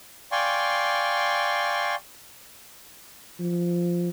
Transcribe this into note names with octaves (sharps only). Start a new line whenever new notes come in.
D5 F5 G5 G#5 C6 C#6
F3